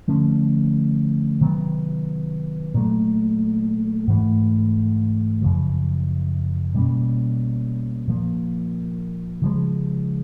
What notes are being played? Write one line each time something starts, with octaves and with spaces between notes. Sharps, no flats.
D3 F3 A3 C#4
C3 D#3 F#3 B3
A#2 F#3 A3
G#2 E3 A3
F#2 C#3 F3
B2 G3 A#3 C#4
A#2 F3 A#3
C#3 F3 G#3